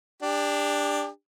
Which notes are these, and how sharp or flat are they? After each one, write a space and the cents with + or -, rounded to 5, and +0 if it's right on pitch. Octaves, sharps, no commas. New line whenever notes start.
D4 +0 G4 +30